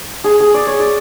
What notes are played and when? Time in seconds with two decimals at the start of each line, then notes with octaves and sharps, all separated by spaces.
0.24 G#4
0.40 G#4
0.54 D5
0.67 C#5
0.80 D5